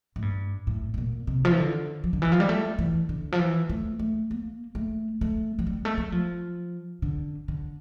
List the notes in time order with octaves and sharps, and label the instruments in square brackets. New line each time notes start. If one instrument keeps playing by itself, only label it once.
[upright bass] A2
G2
A2
A2
A#2
C3
F3
E3
D3
F3
D3
E3
F3
G3
A3
E3
D3
F3
E3
A3
A3
A#3
A3
A3
F3
G3
A3
G3
F3
D3
D3